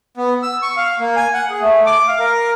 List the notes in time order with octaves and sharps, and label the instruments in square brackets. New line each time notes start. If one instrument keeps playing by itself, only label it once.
[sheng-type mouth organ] B3
E6
C#6
F5
A#3
G#5
F#5
G#4
A3
D6
F5
A#4